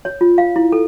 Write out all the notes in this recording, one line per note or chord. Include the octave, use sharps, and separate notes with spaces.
C#5
F4
F5
E4
A4